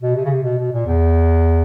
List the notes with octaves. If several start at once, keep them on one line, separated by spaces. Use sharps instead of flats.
B2
C3
C#3
C3
B2
B2
A#2
E2